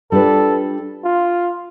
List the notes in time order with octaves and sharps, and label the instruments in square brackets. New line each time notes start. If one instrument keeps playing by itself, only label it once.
[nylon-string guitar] G3 D4 F4 B4 [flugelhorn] A4
[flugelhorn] F4